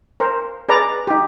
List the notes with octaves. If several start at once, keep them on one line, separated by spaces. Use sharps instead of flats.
A#4 C5
G#4 B4 D5 A#5
D#4 G4